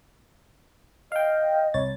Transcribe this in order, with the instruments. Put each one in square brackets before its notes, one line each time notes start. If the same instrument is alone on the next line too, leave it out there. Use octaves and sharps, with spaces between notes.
[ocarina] D#5 [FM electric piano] F5 G5
[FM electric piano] C2 C#5 A6